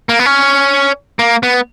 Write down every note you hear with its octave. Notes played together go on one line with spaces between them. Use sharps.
A#3
B3
C#4
A#3
B3